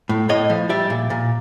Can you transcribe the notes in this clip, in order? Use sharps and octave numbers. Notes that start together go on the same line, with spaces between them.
A2
A2 C#5 D#5
F3
G3 D5 E5
A#2
A#2